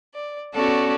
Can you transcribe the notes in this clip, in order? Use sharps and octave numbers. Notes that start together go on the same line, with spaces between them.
D5
B3 C#4 F#4 A4 D5